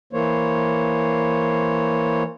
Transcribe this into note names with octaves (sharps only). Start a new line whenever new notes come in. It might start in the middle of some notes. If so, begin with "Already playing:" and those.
E3 A#3 C5 C#5